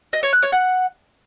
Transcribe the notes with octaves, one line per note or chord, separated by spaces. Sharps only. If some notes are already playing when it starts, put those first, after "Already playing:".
D#5
C#5
F#6
C#5
F#5